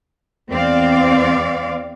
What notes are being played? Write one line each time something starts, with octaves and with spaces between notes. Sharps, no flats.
E2 C4 D5 F5